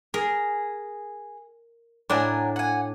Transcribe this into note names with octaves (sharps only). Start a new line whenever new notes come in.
G#4 A#4
A2 D4 A#4 F#5 G#5
F#5 G#5